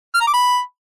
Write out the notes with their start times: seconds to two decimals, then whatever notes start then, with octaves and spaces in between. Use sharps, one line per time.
0.14 F6
0.21 A#5
0.27 D6
0.33 B5